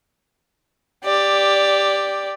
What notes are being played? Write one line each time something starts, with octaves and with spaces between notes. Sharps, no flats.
G4 D5